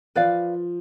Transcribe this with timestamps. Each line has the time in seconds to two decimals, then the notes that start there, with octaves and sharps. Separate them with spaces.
0.15 F3 B4 D5 F5